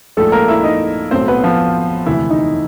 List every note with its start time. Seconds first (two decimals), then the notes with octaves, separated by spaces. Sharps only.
0.17 A#1 G#2 F3 G#3 A3 A4
0.32 A#3 A#4
0.48 E4 E5
0.64 D#4 D#5
1.11 B1 A2 F#3 C4 C5
1.28 B3 B4
1.43 F3 F4
2.06 E1 D2 C3 E3 E4
2.30 D#3 D#4